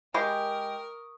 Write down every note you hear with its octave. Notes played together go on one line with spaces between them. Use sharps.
G#3 G4 A#4 B5 C#6 D#6